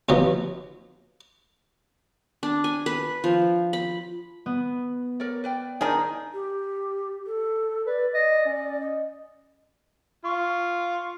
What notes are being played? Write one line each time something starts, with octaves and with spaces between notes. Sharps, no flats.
D#2 B2 F3 F#3
D4
G#5
B4
F3
B5
B3
A#4 C#5 D5
B4 D5 G5
D#3 D4 D#4 G#4
G4
A4
B4 D5
D#5
C#4
D#5
F4 C#6